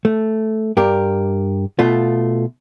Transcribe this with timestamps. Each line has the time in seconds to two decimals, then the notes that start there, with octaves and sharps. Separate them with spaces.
0.05 A3
0.77 G2 G4 A#4
1.79 B2 A3 F4